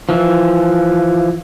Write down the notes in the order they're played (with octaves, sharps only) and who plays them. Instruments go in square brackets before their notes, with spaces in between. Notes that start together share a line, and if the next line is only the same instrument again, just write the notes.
[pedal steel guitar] E3 F3